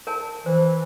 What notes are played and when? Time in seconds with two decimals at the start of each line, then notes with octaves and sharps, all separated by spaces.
0.07 A#4 G#5 A5
0.46 E3 C5